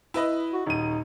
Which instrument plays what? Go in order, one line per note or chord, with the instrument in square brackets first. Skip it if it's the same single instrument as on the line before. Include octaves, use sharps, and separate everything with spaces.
[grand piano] E4 B4 D#5
[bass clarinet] F#4
[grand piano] D#1 D#7 [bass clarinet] D#4